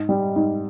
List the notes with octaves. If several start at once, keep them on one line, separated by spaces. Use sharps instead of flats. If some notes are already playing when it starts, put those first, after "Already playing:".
Already playing: G#2
G3
G#2